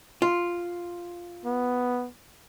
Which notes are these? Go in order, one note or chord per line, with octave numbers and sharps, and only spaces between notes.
F4
B3